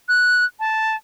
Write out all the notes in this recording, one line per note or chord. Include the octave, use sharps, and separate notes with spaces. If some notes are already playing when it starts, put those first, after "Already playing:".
F#6
A5